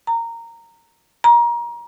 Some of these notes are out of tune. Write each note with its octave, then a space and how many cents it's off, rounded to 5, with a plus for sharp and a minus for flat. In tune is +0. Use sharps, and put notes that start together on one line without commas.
A#5 -15
A#5 +25